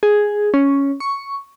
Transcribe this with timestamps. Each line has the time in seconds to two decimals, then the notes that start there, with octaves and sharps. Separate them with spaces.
0.03 G#4
0.54 C#4
1.00 C#6